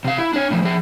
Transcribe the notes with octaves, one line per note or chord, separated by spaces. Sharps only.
C3 F5
E4
D4 C#5
A2 F3
F3 G#4